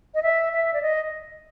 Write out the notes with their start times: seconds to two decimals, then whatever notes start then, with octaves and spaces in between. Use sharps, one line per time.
0.15 D#5
0.23 E5
0.53 E5
0.73 D5
0.82 D#5